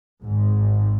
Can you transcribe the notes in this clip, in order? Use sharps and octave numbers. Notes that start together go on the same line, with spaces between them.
G#1 G#2